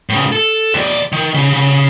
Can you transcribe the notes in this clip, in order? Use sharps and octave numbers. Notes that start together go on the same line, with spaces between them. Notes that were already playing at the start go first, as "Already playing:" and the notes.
A2 C#3
A4
D#2 D5
D#3
C#3
C#3